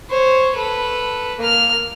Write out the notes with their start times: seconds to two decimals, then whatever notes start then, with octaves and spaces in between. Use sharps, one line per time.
0.10 C5 C#5
0.55 A4 B4
1.39 A#3 F6